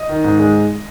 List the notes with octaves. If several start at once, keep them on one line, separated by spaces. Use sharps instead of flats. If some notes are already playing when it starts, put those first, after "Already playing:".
Already playing: D#5
D#3
G#2
G#3